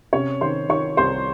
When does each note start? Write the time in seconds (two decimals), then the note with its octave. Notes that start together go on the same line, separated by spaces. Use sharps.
0.13 C3 C#4 C#5
0.41 D#3 C5 C6
0.69 D#3 C#5 C#6
0.97 C2 C5 C6